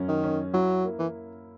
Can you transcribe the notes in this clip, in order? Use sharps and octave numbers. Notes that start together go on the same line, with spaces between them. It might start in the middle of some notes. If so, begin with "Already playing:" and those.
Already playing: F#2 C#4
D#3
C#4
F#3 E4
A#3
E3